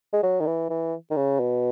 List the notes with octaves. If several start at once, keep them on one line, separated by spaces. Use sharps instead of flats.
G#3
F#3
D#3
E3
E3
D#3
C#3
B2